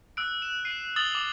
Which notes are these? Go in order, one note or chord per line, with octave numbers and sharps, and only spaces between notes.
E6 F#6 D7
E7
C7 D#7
D#6 E6 A6 F#7 G7
D6